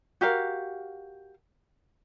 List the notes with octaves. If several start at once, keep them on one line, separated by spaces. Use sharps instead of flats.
F#4 G4 A#4 F5